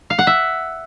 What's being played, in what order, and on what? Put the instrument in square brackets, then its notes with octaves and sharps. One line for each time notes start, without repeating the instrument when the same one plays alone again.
[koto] F5
F#5
E5